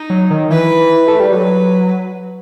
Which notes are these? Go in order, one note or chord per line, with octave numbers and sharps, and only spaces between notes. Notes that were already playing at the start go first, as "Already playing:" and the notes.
Already playing: D#4
F#3
D#3
E3 B4
A3
G3
F#3 B4